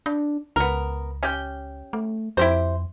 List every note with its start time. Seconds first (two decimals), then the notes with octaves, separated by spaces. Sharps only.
0.06 D4
0.56 C#2 B3 A#4
1.23 C#4 G4 G5
1.93 A3
2.37 F2 E4 G4 C5